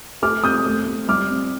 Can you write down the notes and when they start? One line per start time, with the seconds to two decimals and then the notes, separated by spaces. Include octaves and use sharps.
0.22 A3 D6 F6
0.44 C4 D#6 G6
0.66 A3
0.87 C4
1.08 G3 D6 F6
1.31 C4